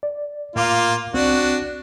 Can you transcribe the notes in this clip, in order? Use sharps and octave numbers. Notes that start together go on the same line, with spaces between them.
D5
A2 A#3 F4 F5 D6
C2 C4 D4 F#4